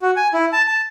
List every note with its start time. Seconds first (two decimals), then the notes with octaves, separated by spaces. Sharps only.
0.02 F#4
0.16 G#5
0.34 E4
0.52 A5
0.67 A5